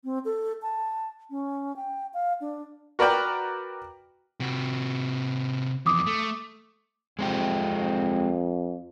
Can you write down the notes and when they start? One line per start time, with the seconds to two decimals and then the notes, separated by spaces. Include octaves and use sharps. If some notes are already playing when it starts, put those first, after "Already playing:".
0.04 C4
0.25 A4
0.62 A5
1.30 C#4
1.76 G5
2.14 F5
2.41 D4
2.99 F#4 A#4 B4 D5 G5
4.40 C3 F#4
5.86 F2 E3 D6 D#6
6.07 A3
7.19 F2 G#3 C4 G4